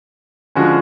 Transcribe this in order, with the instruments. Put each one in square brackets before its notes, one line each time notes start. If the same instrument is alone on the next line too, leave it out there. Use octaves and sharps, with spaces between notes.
[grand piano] D3 F3 G#3 C#4 F#4